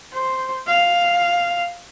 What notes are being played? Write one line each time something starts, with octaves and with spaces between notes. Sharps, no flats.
C5
F5